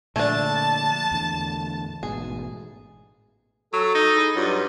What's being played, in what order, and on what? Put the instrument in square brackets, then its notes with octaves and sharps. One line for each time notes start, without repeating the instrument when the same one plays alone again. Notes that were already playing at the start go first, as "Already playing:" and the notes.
[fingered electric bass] A#2 D3 F3 [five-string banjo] A3 D4 [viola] A5
[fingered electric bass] E2 A2 D3
[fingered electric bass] A1 G#2 B2 [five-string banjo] G#4
[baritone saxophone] F#3 [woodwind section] A4
[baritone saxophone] D#4
[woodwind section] G#3 E4 G#4
[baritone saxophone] G2 [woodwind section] F#3 F4